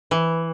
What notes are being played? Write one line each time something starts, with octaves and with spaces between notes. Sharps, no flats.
E3